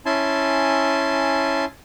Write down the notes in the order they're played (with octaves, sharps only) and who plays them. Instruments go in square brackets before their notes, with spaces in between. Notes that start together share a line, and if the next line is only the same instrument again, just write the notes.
[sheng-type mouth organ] C#4 E4 G#5 A5 C6